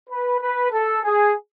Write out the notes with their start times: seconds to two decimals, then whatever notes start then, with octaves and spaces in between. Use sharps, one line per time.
0.09 B4
0.41 B4
0.71 A4
1.04 G#4